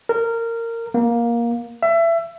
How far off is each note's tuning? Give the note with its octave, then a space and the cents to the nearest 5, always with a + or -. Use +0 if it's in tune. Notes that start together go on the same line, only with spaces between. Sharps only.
A#4 -20
A#3 +15
E5 +25